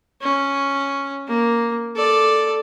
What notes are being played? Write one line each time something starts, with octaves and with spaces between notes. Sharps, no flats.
C#4
A#3
A4 D5